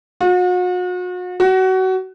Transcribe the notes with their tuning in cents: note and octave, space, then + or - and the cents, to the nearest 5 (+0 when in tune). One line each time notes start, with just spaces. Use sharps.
F#4 -40
F#4 +25